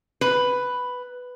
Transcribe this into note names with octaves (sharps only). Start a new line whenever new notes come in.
B4